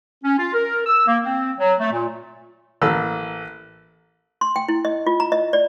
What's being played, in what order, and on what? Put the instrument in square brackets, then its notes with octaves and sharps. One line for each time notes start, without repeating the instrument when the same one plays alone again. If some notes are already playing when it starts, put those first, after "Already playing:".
[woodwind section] C#4
F4
A#4
E6
A#3
C4
F#3
A3
A#2
[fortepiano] A1 A#3 A4 E6 F6
[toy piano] C6
G5
E4
D#5
F4
A#5
D#5
D5